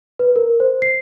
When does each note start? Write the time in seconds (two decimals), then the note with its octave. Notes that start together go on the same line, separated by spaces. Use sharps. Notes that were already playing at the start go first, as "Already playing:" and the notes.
0.19 B4
0.36 A#4
0.60 C5
0.82 C7